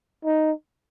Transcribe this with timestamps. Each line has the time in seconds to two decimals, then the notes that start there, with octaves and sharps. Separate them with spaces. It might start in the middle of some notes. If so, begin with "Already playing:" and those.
0.25 D#4